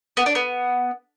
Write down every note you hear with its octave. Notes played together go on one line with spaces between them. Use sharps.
B3
D4
B3